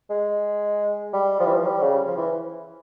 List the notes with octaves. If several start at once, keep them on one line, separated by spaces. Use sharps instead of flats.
G#3
G3
F3
E3
F3
G3
C#3
F3
E3